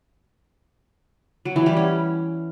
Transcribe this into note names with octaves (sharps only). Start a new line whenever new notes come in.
F#3
E3
G3
C#4